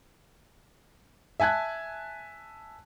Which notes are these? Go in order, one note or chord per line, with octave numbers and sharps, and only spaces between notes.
E5 G#5 A5 F#6 G#6